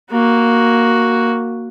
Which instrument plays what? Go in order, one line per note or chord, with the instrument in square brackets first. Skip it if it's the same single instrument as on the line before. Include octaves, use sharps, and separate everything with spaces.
[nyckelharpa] A#3 F#4